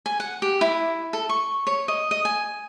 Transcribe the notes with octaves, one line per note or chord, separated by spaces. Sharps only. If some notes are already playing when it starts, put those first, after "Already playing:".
G#5
F#5
G4
E4
A4
C#6
C#5
D#5
D#5
G#5